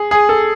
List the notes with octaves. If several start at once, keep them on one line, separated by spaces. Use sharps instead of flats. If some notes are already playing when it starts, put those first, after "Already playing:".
Already playing: G#4
G#4
A4